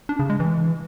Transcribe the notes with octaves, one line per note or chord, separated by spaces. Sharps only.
D4
C#3
G#3
E3